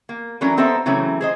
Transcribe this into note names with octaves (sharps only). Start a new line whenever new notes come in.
A#3
E3 F#3 A3 C#4 D4 A#4
B3 C4 A4 C5 E5 A#5
C#3 E3 F#3 A3 C4 C#4
G#4 C5 D#5